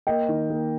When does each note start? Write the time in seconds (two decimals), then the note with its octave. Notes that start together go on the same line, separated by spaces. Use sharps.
0.07 A#3 D#5 G5
0.29 D#3
0.50 A#3